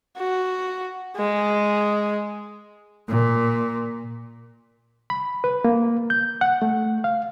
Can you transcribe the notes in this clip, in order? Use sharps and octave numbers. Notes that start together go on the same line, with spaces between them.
F#4
G#3
A#2
B5
B4
A#3
G6
F#5
A3
F5